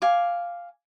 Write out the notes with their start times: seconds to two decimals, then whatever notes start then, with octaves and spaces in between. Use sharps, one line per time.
0.02 F5 G#5 D6